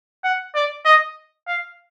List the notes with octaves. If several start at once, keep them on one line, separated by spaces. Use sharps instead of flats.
F#5
D5
D#5
F5